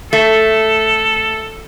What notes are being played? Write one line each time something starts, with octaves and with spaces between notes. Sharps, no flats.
A3 A4